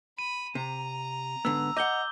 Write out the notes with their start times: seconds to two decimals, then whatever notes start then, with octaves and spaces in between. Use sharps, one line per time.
0.19 B5 D#7
0.55 C3 A#5
1.45 G#2 D3 B3 E6
1.77 D#5 F#5 D6 G6 G7